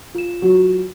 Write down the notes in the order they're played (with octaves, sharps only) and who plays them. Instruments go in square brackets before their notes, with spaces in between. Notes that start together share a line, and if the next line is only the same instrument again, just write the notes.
[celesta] F4 E7
[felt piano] F#3